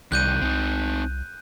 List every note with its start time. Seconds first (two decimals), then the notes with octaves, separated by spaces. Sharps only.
0.12 C2 C3 D#3 G3 F#6 G6 D#7
0.42 C2 C4 D#4